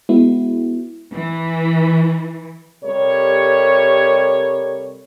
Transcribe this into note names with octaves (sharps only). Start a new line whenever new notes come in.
G#3 B3 E4 F#4
E3
C3 G3 A4 A#4 C#5